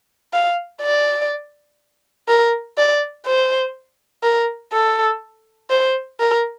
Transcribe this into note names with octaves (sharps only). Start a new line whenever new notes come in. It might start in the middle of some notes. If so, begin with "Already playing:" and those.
F5
D5
A#4
D5
C5
A#4
A4
C5
A#4